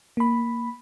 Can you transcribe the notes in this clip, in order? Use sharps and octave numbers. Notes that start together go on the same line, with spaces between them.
A#3 B5